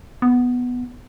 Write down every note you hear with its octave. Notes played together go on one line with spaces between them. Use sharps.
B3